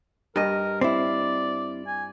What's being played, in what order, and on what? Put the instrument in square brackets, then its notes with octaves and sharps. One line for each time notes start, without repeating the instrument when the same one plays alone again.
[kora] G2 D#5 [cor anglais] A#4
[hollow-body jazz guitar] C4 E4 [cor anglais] D5
[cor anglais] G#5